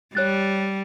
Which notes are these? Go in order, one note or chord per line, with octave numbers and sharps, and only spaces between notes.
G3 C#5 F#6 A6